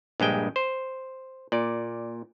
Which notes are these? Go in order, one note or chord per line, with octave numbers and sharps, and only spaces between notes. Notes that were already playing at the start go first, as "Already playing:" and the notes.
A#1 G2 G#3 G5
C5
A#2 D5